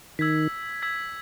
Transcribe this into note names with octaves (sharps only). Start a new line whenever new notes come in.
D#3 E6 G#6 B6
E6 G#6 B6